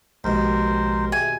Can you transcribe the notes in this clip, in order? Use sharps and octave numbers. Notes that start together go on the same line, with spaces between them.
A#1 D#2 B2 F3 G#3 A#4 C5
G#4 E5 G#5